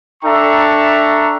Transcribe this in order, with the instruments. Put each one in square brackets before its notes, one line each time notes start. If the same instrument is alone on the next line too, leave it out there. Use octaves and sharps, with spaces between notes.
[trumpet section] D4 A4 E5 G5 A#5 C#6